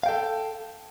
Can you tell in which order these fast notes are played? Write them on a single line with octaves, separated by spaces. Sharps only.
F5 G5 A4